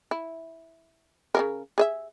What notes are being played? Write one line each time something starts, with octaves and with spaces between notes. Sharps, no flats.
E4
C#3 G#3 A#4
G#4 D#5 E5